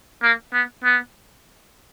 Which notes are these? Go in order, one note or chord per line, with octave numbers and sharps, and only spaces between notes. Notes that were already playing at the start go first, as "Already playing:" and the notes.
A#3
B3
B3